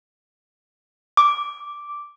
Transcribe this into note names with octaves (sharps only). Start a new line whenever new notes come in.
D6